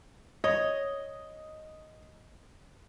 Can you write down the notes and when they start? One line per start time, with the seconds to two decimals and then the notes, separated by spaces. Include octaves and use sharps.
0.44 C#5 D#5